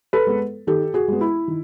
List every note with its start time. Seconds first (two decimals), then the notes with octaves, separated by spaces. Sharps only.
0.13 A4 B4
0.27 G#3 B3
0.67 D#3 G4 A4
0.94 F#4 G#4
1.08 G#3 B3
1.21 E4
1.48 D#3